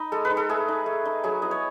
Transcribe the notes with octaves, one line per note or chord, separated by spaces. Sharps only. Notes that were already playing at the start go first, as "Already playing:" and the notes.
Already playing: D#4 D#5 B5
G#3 A4
B4
D#4
A4
A3 G#4
D#4
A3
D#4
F#3 G#4
B3 E4 D#5
C#5